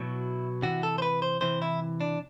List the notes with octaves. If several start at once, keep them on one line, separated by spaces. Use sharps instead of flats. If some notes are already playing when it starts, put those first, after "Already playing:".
Already playing: B2 F#3 E4
C3 E3 F#4
A4
C5
B4
C5
C3 E3 C5
E4
D4